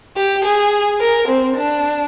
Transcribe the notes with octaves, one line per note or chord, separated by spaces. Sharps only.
G4
G#4
A#4
C4
D4